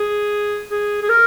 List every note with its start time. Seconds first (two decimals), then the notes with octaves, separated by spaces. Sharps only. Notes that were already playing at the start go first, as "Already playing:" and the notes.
Already playing: G#4
0.71 G#4
1.02 G#4
1.09 A#4